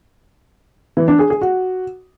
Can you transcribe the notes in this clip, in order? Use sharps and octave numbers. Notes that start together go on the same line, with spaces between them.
E3
D4
G#4
G#4
F#4